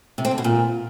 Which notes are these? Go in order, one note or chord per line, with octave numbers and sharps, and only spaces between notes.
C3
C4
D3
B2
A#2